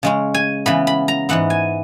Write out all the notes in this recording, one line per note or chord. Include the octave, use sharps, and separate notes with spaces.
C#3 G#3 C#4
G#5
C#3 E3 B3 B5
B5
A#5
G#2 E3 B3 F#5
G#5